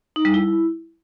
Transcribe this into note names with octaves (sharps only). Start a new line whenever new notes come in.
D#4
G3
E4